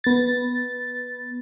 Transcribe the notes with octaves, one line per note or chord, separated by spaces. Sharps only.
B3 A6